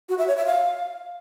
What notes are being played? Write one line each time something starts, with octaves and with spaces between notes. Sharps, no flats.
F#4
E5
C#5
E5
F5